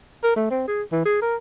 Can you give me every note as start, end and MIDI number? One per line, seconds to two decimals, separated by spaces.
0.23 0.35 70
0.36 0.46 57
0.51 0.66 60
0.68 0.82 68
0.92 1.04 52
1.05 1.19 68
1.22 1.36 70